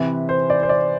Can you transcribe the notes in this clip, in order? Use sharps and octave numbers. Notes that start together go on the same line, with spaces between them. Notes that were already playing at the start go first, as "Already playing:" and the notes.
Already playing: C3 E3 B4
C5
D5
C5
D5